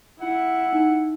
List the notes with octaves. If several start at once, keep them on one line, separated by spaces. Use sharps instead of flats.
E4 F#5
D#4